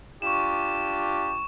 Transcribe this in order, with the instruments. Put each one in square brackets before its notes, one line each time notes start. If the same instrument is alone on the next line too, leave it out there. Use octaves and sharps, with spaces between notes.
[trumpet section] D4 F4 G4 [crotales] C#6 E7